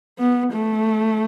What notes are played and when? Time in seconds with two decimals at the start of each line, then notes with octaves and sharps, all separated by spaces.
0.19 B3
0.54 A3